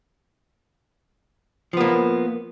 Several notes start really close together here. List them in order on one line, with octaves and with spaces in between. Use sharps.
F3 B3 A#3